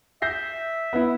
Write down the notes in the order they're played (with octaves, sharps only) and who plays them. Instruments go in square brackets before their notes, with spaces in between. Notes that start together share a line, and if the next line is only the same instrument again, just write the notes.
[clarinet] E5 [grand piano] G6 A#6 C7
[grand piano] B3 E4